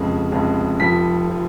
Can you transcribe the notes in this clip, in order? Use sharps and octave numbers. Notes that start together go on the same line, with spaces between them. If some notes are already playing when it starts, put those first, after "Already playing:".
Already playing: F1 F2 C#3 G#3
F1 F2 C#3 G#3
F1 F2 F3 B6
F3